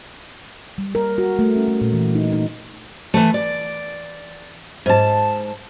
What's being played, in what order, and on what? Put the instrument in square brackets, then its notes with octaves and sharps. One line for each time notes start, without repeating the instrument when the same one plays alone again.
[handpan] G3
A#4
F#4
A3
C#4
A3
A#2
E3
D#4
D#4
[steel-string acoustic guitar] E3 A3
D5
G#2 A5